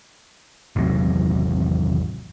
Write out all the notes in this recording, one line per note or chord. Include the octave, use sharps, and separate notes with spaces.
G#1 E2 C3 F#3